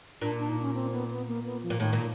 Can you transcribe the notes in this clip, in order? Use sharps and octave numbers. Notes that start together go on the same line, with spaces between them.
A#2 D4
D4
D#4
C#4
C4
B3
B3
A#3
B3
F3
A#2
A2 D#3
A#2